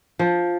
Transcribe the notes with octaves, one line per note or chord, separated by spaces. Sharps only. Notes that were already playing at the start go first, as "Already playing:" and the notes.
F3